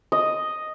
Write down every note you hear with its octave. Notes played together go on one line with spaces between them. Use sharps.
D#5